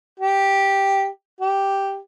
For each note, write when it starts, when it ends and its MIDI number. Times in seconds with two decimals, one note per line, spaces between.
0.20 1.07 67
1.40 1.98 67